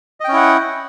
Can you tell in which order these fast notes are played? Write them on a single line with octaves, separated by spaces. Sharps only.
D#5 G5 C#4 E4 F#5